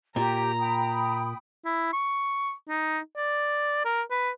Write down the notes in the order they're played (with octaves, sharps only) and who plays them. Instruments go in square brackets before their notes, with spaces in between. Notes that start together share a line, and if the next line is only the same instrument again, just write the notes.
[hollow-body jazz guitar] A#2 [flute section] G4 [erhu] A#5
[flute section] G5 B5 D#6
[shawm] E4
C#6
D#4
D5
A#4
B4